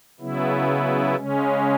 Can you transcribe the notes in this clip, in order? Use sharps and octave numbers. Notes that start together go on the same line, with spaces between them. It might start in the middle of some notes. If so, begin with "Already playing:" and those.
C#3 F#3 B3 E4
C#3 G#3 C#4